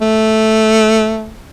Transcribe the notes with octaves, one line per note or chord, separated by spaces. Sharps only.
A3